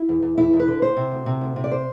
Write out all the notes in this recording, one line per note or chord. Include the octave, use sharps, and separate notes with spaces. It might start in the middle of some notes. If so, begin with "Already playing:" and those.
Already playing: E4
E2
E2
E2 E4
E2
B4
D3
D2 C5
C3
D2
C3
D2
C3
D5
C5